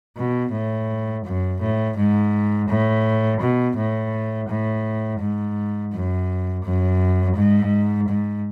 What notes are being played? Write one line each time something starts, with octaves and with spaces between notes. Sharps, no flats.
B2
A2
F#2
A2
G#2
A2
B2
A2
A2
G#2
F#2
F#2
G#2
G#2